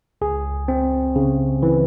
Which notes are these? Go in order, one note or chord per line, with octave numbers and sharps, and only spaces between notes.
C#2 G#4
C4
C#3
E3